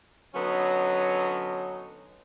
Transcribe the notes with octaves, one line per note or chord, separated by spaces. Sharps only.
D3 F#3 B3 C#4 D#4